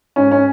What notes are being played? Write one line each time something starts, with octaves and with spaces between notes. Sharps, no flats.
G#2 C#4
C#4